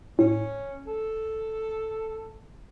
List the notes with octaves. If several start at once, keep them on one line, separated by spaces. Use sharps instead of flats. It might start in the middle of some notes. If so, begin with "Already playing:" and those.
A2 C#4
A4